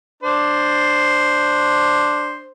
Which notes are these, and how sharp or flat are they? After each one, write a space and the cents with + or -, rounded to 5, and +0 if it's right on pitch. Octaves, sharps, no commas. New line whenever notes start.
D4 +5 C5 +0